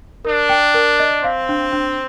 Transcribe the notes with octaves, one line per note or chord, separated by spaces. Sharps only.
D4 A#4
G5
A#4
D#5
C4 F5
D4
D4